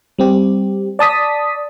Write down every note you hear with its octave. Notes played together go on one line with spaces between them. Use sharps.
G3 C4 G4
D5 A5 D#6 B6